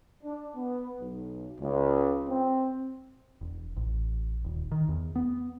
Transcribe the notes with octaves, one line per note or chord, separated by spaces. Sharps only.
D4
B3
B1
C#2
C4
E1
A1
D#1
D#3
E2
B3